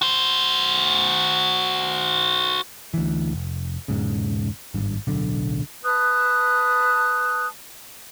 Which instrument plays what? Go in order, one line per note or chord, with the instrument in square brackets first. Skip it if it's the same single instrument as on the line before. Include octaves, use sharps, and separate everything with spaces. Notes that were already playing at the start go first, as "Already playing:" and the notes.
[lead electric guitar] F#4 C5
[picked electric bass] D2 E3
F1
E1 G#2 C#3
G#1 G2
D1 B1 D3
[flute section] B4 A5 D#6 F#6